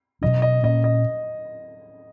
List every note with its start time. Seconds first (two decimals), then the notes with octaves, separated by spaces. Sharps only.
0.21 B2 F#3 C#4 D#5
0.42 D#5
0.63 A#2 A#3 C#4 D#5
0.84 D#5